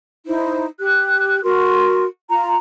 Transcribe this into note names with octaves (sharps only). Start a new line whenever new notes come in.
D#4 E4 C5
G4 F#6
F#4 A#4 C6
F4 A#5